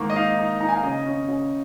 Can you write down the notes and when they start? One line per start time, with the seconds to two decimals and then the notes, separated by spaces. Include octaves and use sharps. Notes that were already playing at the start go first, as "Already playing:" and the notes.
Already playing: G#2 D#3 A#3
0.10 D#5
0.16 D#4 F5
0.39 D#4
0.60 D#4 A#5
0.68 G#5
0.76 F5
0.83 C#3 D#5
1.06 C#4
1.28 C#3